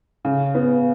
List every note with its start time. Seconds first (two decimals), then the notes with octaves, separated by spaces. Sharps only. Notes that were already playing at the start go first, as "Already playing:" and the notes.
0.25 C#3
0.55 B3